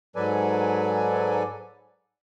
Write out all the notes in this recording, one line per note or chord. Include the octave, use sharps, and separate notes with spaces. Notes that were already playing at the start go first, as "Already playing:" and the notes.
G#2 F#3 A4 B4 D5 G#5